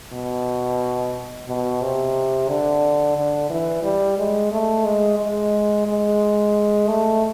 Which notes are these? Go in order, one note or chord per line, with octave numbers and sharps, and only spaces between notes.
B2
B2
C3
D3
D3
E3
G3
G#3
A3
G#3
G#3
G#3
A3